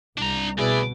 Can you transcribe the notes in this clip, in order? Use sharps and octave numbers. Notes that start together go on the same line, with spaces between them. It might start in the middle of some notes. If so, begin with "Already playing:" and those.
C2 D4 A#5
D2 B2 E4 G#4 B4 D5